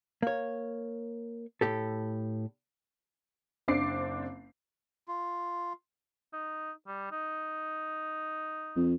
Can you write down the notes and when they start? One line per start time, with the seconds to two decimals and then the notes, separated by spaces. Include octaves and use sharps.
0.22 A#3 C#5
1.61 A2 G4 A4
3.68 F#1 C4 D4 D6 C7
5.08 F4
6.33 D#4
6.87 G3
7.12 D#4
8.76 F2